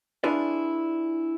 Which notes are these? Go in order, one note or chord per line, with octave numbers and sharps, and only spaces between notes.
D4 E4 F4 G#4 B4 D5